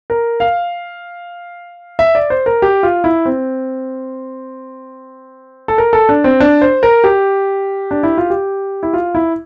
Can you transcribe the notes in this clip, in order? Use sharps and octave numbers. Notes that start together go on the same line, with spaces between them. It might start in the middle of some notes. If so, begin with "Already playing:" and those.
A#4
F5
E5
D5
C5
A#4
G4
F4
E4
C4
A4
A#4
A4
D4
C4
D4
C5
A#4
G4
D4
E4
F4
G4
E4
F4
E4